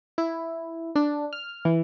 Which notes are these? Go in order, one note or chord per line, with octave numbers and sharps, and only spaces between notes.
E4
D4
F6
E3